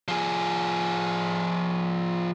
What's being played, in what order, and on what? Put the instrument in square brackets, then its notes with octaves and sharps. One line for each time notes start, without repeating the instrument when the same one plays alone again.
[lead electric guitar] F3 G#4